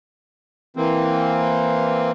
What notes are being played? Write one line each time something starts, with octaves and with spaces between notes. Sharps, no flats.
E3 A#3 C4